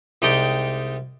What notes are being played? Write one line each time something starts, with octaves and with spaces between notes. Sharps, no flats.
C2 G#3 D#4 G4 D5 G5